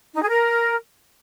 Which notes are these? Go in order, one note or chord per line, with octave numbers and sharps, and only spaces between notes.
D#4
G#4
A#4